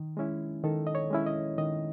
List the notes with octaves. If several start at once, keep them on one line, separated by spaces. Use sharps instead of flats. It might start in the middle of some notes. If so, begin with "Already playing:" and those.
Already playing: D#3
G#3 C#4 E4
D#3 A4
D#5
C#5
G#3 C#4 E4
D#5
D#3 D#5